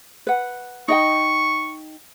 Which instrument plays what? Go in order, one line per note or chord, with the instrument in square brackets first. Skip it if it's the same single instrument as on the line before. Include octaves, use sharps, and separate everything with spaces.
[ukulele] B4 F#5
[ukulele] D#4 D#5 G5 [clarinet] C#6